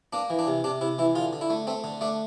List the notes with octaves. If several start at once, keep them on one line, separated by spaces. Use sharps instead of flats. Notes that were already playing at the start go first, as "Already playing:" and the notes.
A#3 D4
E3
D4
C3
C3 D4
C3 E4
E3 E4
D3 F4
D3
E4
A3
A3 C4
D3
A3 D4